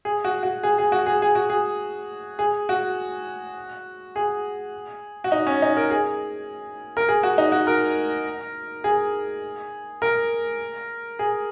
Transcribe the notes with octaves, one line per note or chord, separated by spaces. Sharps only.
G#4
F#4
F#4
G#4
G#4
F#4
G#4
G#4
F#4
G#4
G#4
F#4
G#4
F#4
D#4
C#4
D#4
A#4
G#4
A#4
G#4
F#4
D#4
F#4
A#4
G#4
A#4
G#4